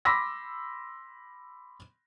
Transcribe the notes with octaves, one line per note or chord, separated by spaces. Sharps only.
B5 C6 D6 E6 A#6 B6